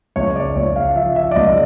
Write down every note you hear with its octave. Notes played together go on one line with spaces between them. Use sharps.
C#2 C#5
D5
C#2 C#5
F5
F3 E5
E5
D5
C#2 D#5